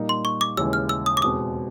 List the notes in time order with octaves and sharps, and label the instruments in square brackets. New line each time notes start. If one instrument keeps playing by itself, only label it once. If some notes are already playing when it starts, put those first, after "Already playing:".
Already playing: [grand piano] A#2 G3 A#3 D#4
[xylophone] C6
C#6
D6
[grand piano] D#2 C#3 E3 G#3 [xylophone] E6
[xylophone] F6
E6
D#6
D6
[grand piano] E2 B2 G#3 C4 [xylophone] D#6